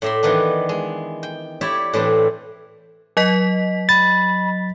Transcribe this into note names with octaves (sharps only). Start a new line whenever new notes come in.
A2 D5 E5 A#5 C6
D#3 E3 B3 D4
G#3
G5
E4 G4 C#5 D5 E5
A2 E3 C4 D4
F#3 D#5 B6
B5 A6